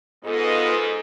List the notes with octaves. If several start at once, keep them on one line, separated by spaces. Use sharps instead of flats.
G#2 B3 F4 A4 D#5